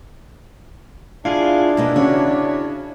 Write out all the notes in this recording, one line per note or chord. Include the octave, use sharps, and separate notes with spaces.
D4 E4 F4 G#4 F5
B2 A#3 D#4 E4
C#3 F#4 C#5